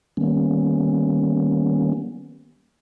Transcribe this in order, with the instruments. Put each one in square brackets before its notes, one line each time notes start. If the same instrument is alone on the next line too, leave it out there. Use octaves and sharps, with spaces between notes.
[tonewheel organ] D#3 G3 A#3 B3 C#4